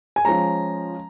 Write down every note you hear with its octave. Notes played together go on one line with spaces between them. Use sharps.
G#5
F3 G#3 C#4 A#5